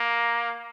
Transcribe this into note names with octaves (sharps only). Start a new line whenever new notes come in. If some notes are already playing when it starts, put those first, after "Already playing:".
Already playing: A#3